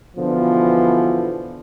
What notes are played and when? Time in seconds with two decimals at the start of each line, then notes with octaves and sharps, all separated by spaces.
0.17 B2 D3 E3 F3